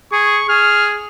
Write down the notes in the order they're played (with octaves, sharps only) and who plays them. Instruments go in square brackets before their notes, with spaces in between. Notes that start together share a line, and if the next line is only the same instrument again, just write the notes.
[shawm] G#4 [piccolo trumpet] C#6
[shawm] G#4 [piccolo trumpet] F6